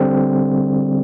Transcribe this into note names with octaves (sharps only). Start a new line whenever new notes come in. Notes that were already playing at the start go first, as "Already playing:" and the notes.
Already playing: D3 G3 C4